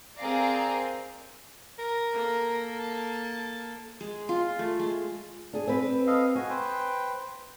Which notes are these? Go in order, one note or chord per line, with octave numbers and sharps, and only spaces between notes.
C4 G#4 A#4 D5 F5 A#5
A#4
A#3 A4
A5
G#3
F4
A3
G#3
D4 G#4
C4 B4
A4 D#5 F5
F#4 G#5
B4 C5 G5